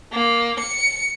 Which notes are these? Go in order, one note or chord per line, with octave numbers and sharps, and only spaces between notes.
A#3
C#7